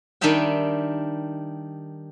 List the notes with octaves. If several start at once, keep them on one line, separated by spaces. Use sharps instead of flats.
D#3 G3 D4 D#4 E5 G5